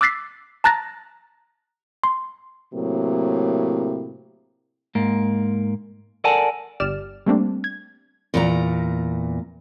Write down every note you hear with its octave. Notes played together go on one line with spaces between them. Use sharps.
D6 E6 F#6 A6 B6 C7
A5 A#5 F#6 A6 A#6
C6
A2 C3 F#3 A#3
G#2 A#3
A4 A#4 D5 F#5 G#5 A5
G1 G4 D5 F6 E7
G3 A3 A#3 C4 D4
G#6
E2 A#2 A#5